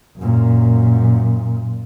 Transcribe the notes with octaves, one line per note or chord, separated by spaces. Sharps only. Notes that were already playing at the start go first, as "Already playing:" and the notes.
F#2 A#2